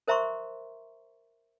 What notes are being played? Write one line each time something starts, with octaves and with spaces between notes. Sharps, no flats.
A#4 C5 E5 A#5 C6 C#6